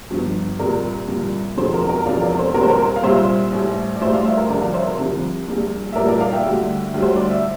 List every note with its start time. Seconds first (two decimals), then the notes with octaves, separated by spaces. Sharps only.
0.10 G1 G2 F3
0.59 C2 A#2 G3 A#4 D5
1.08 C2 A#2 G3
1.57 E1 E2 C3 F3 A4 C5
1.74 A#4
1.89 A#4
2.06 E1 E2 C3 F3 D5 F5
2.22 A#4 D5
2.39 A4 C5
2.54 C2 A#2 G3 A#4
2.63 C5
2.70 A#4
2.96 F5
3.03 C2 A#2 G3 C5 E5
3.52 A1 A2 G3
3.96 D5
4.01 A1 A2 G3 C5 E5
4.13 D5 F5
4.25 C5 E5
4.37 A#4
4.49 C2 C3 F3 A#4 D5
4.62 D5 F5
4.74 C5 E5
4.87 A#4
4.98 C2 C3 F3
5.47 A#1 A#2 G3
5.93 E5
5.96 A#1 A#2 G3 A#4 D5
6.08 A#4 D5
6.21 D5 F5
6.32 E5 G5
6.45 D2 D3 G3
6.94 D2 D3 G3
7.02 C5
7.16 D5
7.30 E5